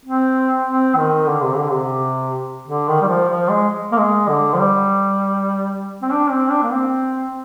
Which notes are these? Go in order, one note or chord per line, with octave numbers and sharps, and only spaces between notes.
C4
C4
D#3
D3
C3
D3
C3
D3
D#3
G3
F3
F3
G#3
A#3
G#3
D3
F3
G3
C4
D4
C4
D4
A#3
C4